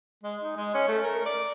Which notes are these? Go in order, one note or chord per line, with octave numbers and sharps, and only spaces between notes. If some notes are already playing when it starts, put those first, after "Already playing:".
G#3
D#4
G#3
C#4
A3
A#4
D5